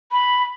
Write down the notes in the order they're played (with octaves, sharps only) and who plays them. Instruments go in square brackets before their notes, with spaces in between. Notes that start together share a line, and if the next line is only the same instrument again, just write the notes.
[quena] B5